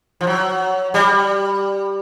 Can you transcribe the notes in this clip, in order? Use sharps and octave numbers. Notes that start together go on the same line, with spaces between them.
F3
F#3
G3